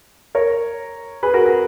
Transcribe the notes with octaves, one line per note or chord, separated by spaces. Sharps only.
A#4 C#5
G#4 B4
F#4 A#4
G#4